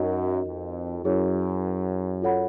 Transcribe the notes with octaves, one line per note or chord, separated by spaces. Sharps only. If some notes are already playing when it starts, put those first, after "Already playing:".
Already playing: F#2 D#4 F#4 A#4 D#5
F2
F#2 E4 G#4 C#5
F4 A4 C#5 F#5 B5